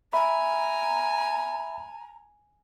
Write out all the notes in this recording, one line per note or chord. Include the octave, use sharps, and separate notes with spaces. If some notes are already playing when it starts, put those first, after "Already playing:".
E5 G#5 A#5 B5